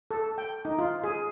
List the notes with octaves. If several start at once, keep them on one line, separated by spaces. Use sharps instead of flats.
A4
G5
D#4
F4
G#4